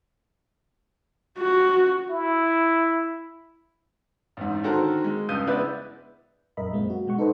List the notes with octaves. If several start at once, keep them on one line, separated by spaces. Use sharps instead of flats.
F#4
E4
A1 G#2
D3 D#3 F#4 A4 A#4 C5
G#3
C#2 G2 D#6 G6 D#7
G#3 B3 E4 B4 D5
A#1 F#2 A#4 D#5 E5 B5
F#2 A#2 G#3 A#3 C4
F#4
B2 G#3 F#5 C#6
D#4 A4 B4 C5 D#5